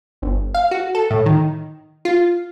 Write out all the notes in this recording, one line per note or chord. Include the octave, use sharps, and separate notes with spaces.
G1
F5
F#4
A4
A2
D#3
F4